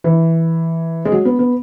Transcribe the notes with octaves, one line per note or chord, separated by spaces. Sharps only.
E3
G#3
F#3
B3
B3